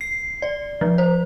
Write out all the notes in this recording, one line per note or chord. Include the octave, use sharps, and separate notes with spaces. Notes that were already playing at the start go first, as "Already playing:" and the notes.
C7
D5
F3
C5